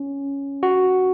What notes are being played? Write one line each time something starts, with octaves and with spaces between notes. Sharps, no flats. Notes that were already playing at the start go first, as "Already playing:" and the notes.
Already playing: C#4
F#4